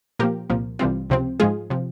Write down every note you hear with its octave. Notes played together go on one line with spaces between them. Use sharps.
A#2 F3 A#3 G4 A#4
C2 A#2 F3 A#3
C2 C3 E3 G3 C4 F4
C#2 C3 F3 C4
G#2 F3 G#3 F4 G#4
C3 F3